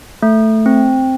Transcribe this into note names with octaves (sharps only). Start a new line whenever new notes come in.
A3
C4